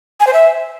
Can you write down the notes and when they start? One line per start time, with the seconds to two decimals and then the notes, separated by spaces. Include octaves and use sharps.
0.20 G#5
0.27 C5
0.33 E5